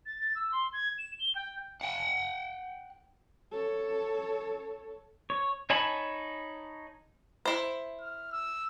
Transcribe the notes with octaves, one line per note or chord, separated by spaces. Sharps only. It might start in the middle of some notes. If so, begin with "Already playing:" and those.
A6
A6
E6
C6
G#6
E7
G7
G5
F#5 G5
A4 C#5
C#5
D#4 C#5 G#5 A5 B5
E4 C5
F6
E6